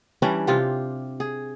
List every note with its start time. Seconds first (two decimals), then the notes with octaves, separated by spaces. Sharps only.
0.22 E3 G3 C#4 D4
0.47 C3 F4 G4
1.20 G#4